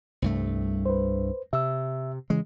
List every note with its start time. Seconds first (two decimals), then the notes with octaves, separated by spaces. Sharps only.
0.22 C2 G2 A3
0.86 B4 C5
1.53 C3 E5 E6
2.30 C#3 E3 G#3